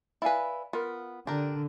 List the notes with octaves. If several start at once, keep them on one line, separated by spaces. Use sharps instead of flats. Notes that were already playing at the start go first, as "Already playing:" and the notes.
E4 B4 D5 F5 G#5
B3 F4 A#4
D3 D4 G4 A#4